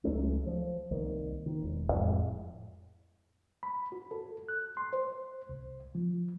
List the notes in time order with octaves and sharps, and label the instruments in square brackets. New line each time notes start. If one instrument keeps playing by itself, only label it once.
[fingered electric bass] C#2 F#3 A3 C#4
F3
C2 D#3 A#3
D#3
E1
F2 A2 G#3
[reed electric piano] B5
F#4
A4
F#6
C6
C5
C2
F3